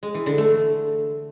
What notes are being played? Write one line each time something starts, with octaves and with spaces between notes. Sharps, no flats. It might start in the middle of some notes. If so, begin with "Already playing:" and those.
G#3
E3
D3
A3